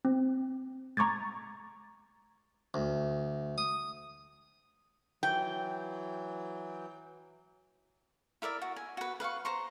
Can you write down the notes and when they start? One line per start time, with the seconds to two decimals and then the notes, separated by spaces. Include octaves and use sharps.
0.05 C4
0.97 A#5 C#6 D6 G#6 A6
2.74 D2
3.58 D#6
5.23 E3 F#3 G5
8.42 E4 A#4 D5 E5
8.62 F#4
8.76 G#5
8.97 F#4 B4
9.20 B4 F5 F#5 C#6
9.45 C5 A#5 C6 C#6